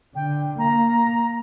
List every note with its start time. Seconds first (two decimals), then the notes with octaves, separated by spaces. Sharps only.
0.15 D3 G5
0.59 A#3 A#5